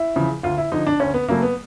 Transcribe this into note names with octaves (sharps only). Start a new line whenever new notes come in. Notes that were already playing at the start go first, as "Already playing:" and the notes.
Already playing: E4
E2 C#3 F3
D2 F4
E4
D3 F3 D#4
D4
D2 C#4
B3
C#3 F#3 A3 A#3
B3